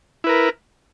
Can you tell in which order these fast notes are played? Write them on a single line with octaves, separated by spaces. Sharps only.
E4 B4 A#4